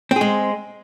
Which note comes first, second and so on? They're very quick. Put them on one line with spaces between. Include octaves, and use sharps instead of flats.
C4 G#4 G#3